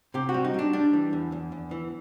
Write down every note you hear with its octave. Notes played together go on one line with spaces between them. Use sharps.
C3 G4
F#4
G3
D#4
G3 D4
G3 D4
E3
E2
E2
E2
E3